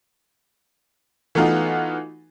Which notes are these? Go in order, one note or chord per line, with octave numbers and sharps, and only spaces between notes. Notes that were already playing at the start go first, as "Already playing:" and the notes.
E3 A3 B3 D#4 F4 F#4